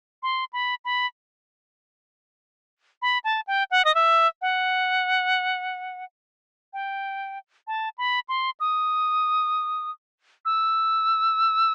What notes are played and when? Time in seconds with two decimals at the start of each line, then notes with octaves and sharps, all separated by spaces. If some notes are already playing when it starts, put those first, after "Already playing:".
0.23 C6
0.53 B5
0.85 B5
3.02 B5
3.24 A5
3.47 G5
3.71 F#5
3.85 D#5
3.95 E5
4.42 F#5
6.73 G5
7.67 A5
7.98 B5
8.29 C6
8.60 D#6
10.45 E6